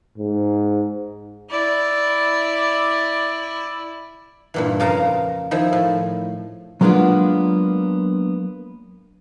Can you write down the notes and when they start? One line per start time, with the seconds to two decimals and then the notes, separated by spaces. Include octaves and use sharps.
0.18 G#2
1.50 E4 D5
4.54 G2 A#2 E3
4.80 F2 C#3 A#4 F5 A5 A#5
5.51 D#3 F3 E4
5.73 A2
6.81 F#3 G#3 A#3 B3 D4 F4